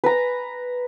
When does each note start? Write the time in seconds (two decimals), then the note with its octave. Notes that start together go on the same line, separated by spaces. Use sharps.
0.04 B4 A#5